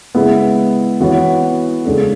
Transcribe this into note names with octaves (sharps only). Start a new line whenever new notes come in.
C#3 G#3 B3 E4
E3 B3 F#4 C#5
C#3 G#3 D4 A4